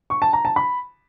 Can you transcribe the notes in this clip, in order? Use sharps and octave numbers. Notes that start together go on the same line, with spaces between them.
C#6
A5
A#5
A5
B5